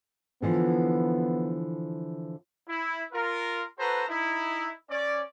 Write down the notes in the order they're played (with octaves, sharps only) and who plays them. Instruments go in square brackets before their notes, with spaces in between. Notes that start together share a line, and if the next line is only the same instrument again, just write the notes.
[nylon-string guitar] D3 E3 F3 [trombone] B3
[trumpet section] E4
F4 A#4
F#4 A4 B4 C5 A#5
D#4 E4
C#4 D5